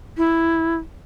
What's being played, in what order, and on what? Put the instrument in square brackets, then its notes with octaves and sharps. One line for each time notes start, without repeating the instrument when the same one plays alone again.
[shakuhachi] E4